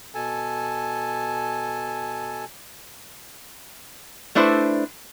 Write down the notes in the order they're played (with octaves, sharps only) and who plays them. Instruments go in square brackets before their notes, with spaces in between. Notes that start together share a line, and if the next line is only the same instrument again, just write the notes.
[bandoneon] B2 A4 G#5 A5
[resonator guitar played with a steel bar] A3 D4 E4 B4 C5